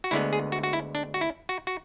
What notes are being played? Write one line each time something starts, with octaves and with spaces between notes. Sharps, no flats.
F#4
D2 D3 G#3 B3 E4
G#4
F#4
F#4
E4
D4
F#4
E4
F#4
F#4